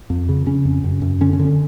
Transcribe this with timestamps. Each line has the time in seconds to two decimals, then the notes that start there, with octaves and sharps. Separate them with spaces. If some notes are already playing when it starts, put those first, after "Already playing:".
0.10 F2
0.29 C#3
0.46 C#3 C#4
0.65 F2
0.84 F#2
1.02 F#2
1.21 D3 C#4
1.33 C#4
1.39 D3
1.45 C#4